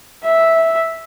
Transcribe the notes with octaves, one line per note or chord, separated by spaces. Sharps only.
E5